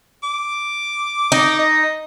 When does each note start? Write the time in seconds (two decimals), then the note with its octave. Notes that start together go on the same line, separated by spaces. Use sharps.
0.23 D6
1.32 D#4
1.59 D#5